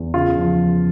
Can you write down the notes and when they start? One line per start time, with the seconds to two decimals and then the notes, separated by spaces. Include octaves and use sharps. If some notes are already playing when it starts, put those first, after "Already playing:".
Already playing: E2
0.14 C#3 F4
0.37 F3